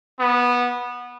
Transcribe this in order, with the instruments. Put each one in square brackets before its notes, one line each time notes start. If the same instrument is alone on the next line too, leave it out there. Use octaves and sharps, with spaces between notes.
[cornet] B3